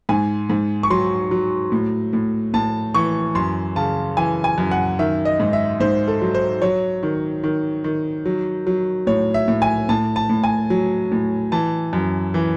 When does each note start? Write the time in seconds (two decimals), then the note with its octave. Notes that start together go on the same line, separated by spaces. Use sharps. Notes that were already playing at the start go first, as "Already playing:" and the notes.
0.09 G#2 G#5
0.50 G#2
0.83 C#6
0.90 F#3 C6
1.31 F#3
1.72 A2
2.13 A2
2.54 A2 A5
2.94 E3 C#6
3.35 F#2 C6
3.76 C#3 A5
4.17 E3 G#5
4.44 G#5
4.58 F#2
4.71 F#5
4.99 D#3 E5
5.25 D#5
5.40 G#2
5.53 E5
5.80 G#2 C5
6.08 A4
6.22 F#3
6.35 C5
6.62 F#3 C#5
7.03 D#3
7.44 D#3
7.84 D#3
8.26 F#3
8.67 F#3
9.07 A2 C#5
9.34 E5
9.48 A2
9.62 G#5
9.89 A2 A5
10.16 A5
10.29 A2
10.44 G#5
10.70 F#3
11.11 A2
11.52 E3 A5
11.93 F#2
12.34 E3